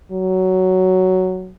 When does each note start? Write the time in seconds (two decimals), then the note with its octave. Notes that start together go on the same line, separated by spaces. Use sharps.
0.12 F#3